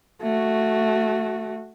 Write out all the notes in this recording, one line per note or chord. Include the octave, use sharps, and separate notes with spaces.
A3 F#4